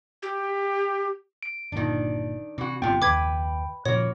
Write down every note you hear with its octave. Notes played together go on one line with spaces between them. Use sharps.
G4
D7
G1 A#2 D#3 D4
C3 E3 F#4
G1 A2 C3 B3 F4 G5
F#1 D#2 B4 D6 G#6
A#2 C#3 F3 A#3 F#4 C#5